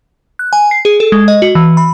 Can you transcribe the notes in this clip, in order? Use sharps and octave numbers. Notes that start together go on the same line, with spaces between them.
F#6
G#5
C7
G#4
A4
G#3
D#5
F#4
E3
B5